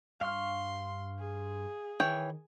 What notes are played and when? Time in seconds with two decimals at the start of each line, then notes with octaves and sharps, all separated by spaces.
0.21 G2 F5 C6 C#6 F6
1.19 G#4
2.00 D#3 E3 C#5 G5